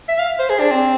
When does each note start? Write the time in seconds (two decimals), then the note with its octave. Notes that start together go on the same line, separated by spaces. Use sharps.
0.09 E5
0.19 F5
0.39 C5
0.50 G#4
0.60 D4
0.71 C4